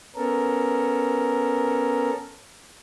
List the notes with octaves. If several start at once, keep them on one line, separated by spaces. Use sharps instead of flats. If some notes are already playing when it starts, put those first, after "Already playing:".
B3 C#4 A4 A#4